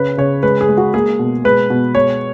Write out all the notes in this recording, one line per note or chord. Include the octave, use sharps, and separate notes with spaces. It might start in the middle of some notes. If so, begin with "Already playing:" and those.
Already playing: C#3 B4
C#3 C#5
G#3 B4
G#4
G#3
F#4
A#3 G#4
B2
G#3 B4
B2
G#3 C#5